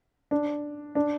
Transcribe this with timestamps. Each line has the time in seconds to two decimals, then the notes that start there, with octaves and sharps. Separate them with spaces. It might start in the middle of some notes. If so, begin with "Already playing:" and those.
0.31 D4
0.95 D4